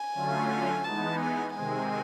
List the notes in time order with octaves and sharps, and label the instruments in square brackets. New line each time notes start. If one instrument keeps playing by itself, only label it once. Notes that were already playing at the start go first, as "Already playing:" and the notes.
Already playing: [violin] G#5
[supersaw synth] D3 F#3 A3 C#4 F4
[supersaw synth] E3 G#3 B3 D#4 [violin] A5
[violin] G#5
[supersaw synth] C3 D#3 G#3 C4 [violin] G#5